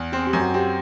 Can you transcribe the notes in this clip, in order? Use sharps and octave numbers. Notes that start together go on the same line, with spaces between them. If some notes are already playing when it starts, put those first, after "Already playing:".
Already playing: E2
C4 G#4
G4
F#2
F#4
C4 G4